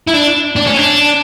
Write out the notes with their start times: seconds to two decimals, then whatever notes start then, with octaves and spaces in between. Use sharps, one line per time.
0.07 E4
0.13 D4
0.56 D4
0.66 C#4
0.77 D4